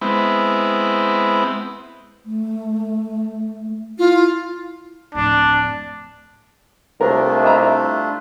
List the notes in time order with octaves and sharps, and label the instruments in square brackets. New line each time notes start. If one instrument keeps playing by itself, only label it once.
[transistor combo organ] G#3 B3 C4 E4
[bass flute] A3
[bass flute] E4 [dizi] F4
[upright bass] D1 F2 [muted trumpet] D4
[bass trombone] C2 [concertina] A3 D4 F4 [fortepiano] A#4 C5
[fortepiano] D#5 E5 A#5